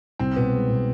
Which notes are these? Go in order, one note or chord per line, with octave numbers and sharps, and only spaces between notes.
C2 C4
B2 B3
G#3
B2